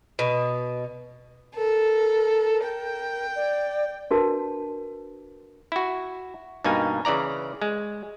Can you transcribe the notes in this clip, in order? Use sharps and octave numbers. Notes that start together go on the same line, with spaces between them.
B2
A4 A#4
G5
D5
D4 F#4 A#4 B4 A5
E4 F#4
G2 B2 A#3 D#4 G#5
C#3 E3 D5 A#5
G#3